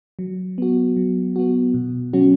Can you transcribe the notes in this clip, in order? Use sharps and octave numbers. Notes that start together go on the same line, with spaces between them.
F#3
B3 F#4
F#3
B3 F#4
B2
F#3 C#4 F#4